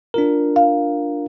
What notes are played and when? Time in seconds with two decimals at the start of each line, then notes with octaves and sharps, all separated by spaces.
0.14 D4 F4 A#4
0.56 F5